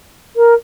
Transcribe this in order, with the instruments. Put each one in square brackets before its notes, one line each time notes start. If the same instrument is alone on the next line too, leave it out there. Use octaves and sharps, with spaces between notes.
[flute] A#4